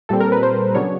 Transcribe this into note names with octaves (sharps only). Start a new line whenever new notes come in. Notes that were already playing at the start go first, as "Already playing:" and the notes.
A#2 G3 C4 A4
A#4
B4
C5
C#3 F#3 B3 D4 C#5